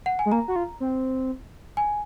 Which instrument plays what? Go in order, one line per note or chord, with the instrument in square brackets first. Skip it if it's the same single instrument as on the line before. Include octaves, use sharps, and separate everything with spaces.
[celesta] F#5
G#5
[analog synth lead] G#3
[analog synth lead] A#3 [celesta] A#5
[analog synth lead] F#4
F4
C4
[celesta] G#5